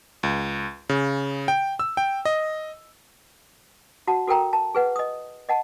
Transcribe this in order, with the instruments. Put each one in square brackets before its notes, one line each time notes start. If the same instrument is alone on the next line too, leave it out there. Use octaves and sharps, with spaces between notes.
[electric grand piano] C#2
C#3
G5
E6
G5
D#5
[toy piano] F#4 F#5 A5
F#4 A4 A#4 G5 A#5
A5
G#4 B4 F#5
D#5 D#6
D#5 F#5 A5